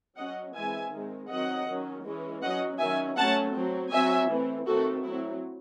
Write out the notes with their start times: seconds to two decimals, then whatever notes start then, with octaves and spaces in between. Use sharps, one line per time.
0.17 F#3 C#4 D#5 F#5
0.55 E3 G#3 C4 E5 G#5
0.92 D#3 G#3 C4
1.29 D#3 F#3 C4 D#5 F#5
1.67 D#3 F#3 C#4
2.05 E3 G#3 C#4
2.42 F#3 C#4 D#5 F#5
2.79 D#3 F#3 C#4 E5 G#5
3.17 F#3 A3 C#4 F#5 A5
3.54 F#3 C4
3.91 F#3 C4 E5 G#5
4.29 E3 A3 C4
4.67 D#3 A3 C4 F#4 A4
5.03 F#3 C4 E4